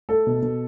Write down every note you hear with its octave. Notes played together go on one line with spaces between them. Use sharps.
A3 A4
B2
B2